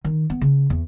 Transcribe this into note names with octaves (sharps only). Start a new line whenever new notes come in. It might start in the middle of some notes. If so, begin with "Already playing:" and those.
D#3
B3
C#3
E2